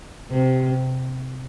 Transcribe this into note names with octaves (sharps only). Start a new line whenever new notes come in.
C3